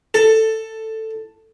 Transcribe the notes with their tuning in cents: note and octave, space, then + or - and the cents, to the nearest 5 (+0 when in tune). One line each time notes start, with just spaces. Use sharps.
A4 +10